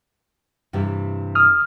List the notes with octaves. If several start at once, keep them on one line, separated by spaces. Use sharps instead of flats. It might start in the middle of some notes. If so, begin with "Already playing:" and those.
G2 C3 E3
D#6 F6